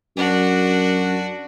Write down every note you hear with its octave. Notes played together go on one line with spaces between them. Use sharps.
F#2 D4 F#4